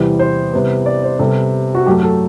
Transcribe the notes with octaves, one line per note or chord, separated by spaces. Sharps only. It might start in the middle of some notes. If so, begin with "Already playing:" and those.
Already playing: E2 C3 E3 G3
C5
C3 E3 G3 B3
D5
C5
C3 G3 B3 A4
F#4
F#2 F#3 A3 G4
A4